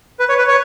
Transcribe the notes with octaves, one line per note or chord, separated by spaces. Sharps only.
B4
C#5
B4
C#5